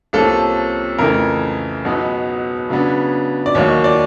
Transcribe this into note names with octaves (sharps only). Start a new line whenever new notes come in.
C2 C3 F3 A#3 C#4 A4
F2 C#3 E3 A3 A#4
C#2 B2 F#3 B3 D#4
C#3 F#3 B3 D4
D5
D#2 D#3 F#3 A#3 C#5
D5